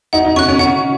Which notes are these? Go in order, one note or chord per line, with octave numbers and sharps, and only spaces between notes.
D#4 F#5
D#4
C#4 C#6 F#6
C#4
C#4 F#5